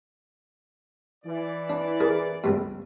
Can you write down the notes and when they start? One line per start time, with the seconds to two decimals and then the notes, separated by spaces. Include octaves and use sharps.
1.24 E3 D5
1.70 D4
2.01 G#4 A#4
2.44 C#2 G2 B2